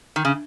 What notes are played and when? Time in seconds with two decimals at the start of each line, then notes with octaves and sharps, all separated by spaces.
0.16 D#3
0.25 C#3